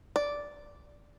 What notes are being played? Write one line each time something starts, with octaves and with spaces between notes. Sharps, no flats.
D5